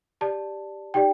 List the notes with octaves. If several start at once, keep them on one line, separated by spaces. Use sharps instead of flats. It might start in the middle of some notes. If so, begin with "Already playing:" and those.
G4 D5 A5
D#4 G4 D5 G5